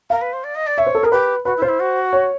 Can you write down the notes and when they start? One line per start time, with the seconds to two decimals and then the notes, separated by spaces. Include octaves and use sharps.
0.10 A#4 F5
0.21 B4
0.33 C5
0.44 D5
0.55 D#5
0.66 D5
0.78 C#5 E5
0.87 C5
0.95 A4
1.03 G#4 A#4
1.11 G4 B4
1.45 F#4 B4
1.57 E4
1.62 F4 C5
1.68 E4
1.79 F#4
2.13 C#5